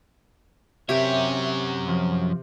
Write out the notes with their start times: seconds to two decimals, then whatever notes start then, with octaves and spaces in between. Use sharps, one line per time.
0.89 F#2 C3 G4 A#4 C#5 E5
1.88 F3